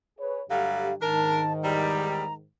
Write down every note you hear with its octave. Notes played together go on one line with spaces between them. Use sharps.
G#4 B4 C#5
G2 D3 F#3 G3 A3 G4 F5
G#2 D#3 D4 A#4 A5
E2 G3 A#5